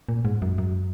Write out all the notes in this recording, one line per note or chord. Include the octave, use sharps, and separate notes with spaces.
A#2
G#2
F#2
F#2